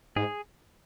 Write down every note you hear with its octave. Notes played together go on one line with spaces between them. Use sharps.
G#2 G#4